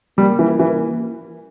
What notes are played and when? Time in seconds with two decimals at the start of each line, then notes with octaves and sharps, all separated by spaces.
0.18 G3 A#3
0.39 E3
0.60 E3